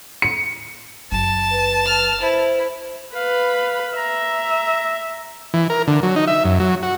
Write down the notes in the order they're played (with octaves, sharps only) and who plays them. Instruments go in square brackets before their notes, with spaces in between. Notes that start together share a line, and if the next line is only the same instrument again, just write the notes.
[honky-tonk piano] C#7
[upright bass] F#1 F#3 [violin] A5
[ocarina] B4
[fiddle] F6
[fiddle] E4 [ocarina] C5
[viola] B4 B5 [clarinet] F5
[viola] E5 [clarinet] A#5
[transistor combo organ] E3
A#4
D3
F#3
D#4
E5
F#2
F#3
F#4